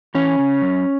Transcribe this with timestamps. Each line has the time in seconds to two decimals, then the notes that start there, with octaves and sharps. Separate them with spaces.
0.15 E3 C#4
0.39 C#3
0.62 F#2